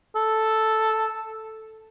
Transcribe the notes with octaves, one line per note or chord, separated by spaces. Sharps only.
A4